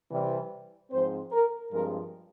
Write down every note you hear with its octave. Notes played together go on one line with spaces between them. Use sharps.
C3 E3 G3
G#2 F3 C4 C5
A#4
G2 F3 G#3 C4 A#4